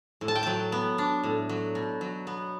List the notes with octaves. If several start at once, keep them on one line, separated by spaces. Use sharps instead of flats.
A2
A5
G5
F#3 A5
B3
D4
A2
F#3
B2
F#3
B3